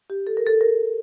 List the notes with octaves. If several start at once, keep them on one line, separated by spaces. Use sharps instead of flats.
G4
A4
A#4
A4
A#4